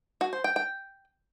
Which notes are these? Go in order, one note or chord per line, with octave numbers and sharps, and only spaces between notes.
F#4
C5
G5
G5